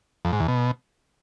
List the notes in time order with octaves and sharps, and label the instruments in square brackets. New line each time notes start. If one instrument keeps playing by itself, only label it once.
[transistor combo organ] F2
G#2
E2
B2